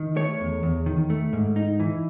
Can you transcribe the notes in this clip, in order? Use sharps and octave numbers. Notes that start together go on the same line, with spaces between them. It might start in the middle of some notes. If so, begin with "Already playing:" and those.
Already playing: D#3
A3 C#5
E2
E2
D#3
A3
G#2
D#4
E3